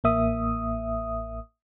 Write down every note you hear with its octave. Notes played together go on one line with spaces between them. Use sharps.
A1 A#3 E5 D#6